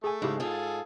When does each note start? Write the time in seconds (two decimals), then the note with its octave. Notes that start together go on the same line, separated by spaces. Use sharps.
0.04 A3 G#4 G#5
0.22 G#2 C#3 G#3 D#4 E4 G4
0.40 G#2 F4 G#4 A4 G#5